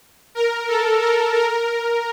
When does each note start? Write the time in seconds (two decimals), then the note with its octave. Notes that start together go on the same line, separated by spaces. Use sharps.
0.35 A#4
0.68 A4
1.01 A#4
1.34 A#4